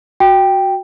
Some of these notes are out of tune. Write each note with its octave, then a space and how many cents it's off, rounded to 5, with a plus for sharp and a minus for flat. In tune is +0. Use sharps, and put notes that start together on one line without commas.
F#4 +0 G5 +0